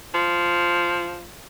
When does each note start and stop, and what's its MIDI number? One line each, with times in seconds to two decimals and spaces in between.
0.14 1.26 53